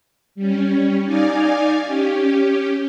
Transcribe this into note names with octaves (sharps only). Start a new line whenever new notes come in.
G3 C#4
D#4 D5 F5 G#5
C#4 G4